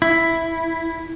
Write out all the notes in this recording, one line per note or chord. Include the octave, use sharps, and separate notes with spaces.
E4